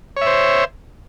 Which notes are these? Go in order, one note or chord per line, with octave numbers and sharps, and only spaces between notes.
C5 C#5 E5